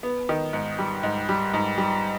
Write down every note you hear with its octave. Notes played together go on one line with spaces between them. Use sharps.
B3
D#3
G#2
G3
G#2
G3
G#2
G3